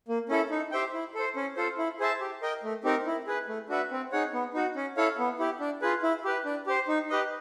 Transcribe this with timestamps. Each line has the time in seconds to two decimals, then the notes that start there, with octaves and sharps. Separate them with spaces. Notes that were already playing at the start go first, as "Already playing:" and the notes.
0.08 A#3
0.29 C#4 E4 A4
0.51 D#4
0.72 G4 C5 E5 G5
0.94 E4
1.15 A4 C5
1.36 C#4
1.56 F4 A4 C5
1.78 E4
2.00 G#4 C5 E5 A5
2.21 G4
2.42 A#4 D#5 G5
2.63 A3
2.84 C4 D#4 G4 A#4
3.06 E4
3.27 G#4 B4
3.48 A3
3.69 D4 F#4 B4 E5
3.91 C4
4.12 D#4 G#4 C#5 F#5
4.33 B3
4.54 D#4 F#4
4.76 C#4
4.97 E4 A4 C#5 F5
5.18 B3
5.39 E4 G4
5.60 D4
5.82 F4 G#4 B4
6.03 E4
6.25 G4 B4
6.45 D4
6.67 G4 C5
6.88 D#4
7.10 G4 B4 D#5